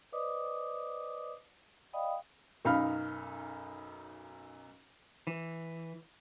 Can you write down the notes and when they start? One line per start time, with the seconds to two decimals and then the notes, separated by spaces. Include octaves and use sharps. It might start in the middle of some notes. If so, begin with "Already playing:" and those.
0.12 B4 C5 D5 D#5 D6 D#6
1.93 D5 D#5 F5 G5 B5 D#6
2.65 B1 F#2 D#4 F5 B5 F6
5.27 E3